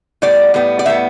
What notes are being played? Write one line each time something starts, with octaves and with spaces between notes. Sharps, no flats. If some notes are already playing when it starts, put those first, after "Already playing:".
A2 G3 B3 D5
A2 G3 B3
D5
A2 G3 B3 E5